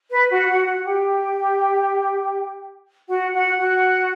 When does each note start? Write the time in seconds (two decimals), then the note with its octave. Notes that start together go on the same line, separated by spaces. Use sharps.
0.11 B4
0.30 F#4 F#5
0.49 F#4 F#5
0.67 F#4 F#5
0.86 G4 G5
3.09 F#4 F#5
3.33 F#4 F#5
3.57 F#4 F#5